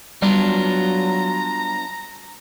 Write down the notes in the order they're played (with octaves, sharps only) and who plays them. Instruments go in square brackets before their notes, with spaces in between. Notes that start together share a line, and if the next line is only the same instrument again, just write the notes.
[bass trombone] F#3 [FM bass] G3 [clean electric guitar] B3 D4 F4 [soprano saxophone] A#5